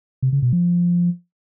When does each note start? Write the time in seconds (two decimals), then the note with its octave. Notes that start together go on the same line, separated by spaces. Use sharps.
0.23 C3
0.32 C#3
0.42 B2
0.52 F3